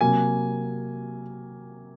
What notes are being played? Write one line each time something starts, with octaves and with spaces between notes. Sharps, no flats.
C3 F#3 A#3 G#5